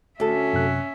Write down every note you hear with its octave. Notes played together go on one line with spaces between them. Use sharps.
D2 C#4 A4 E5
F#2 C3 F#6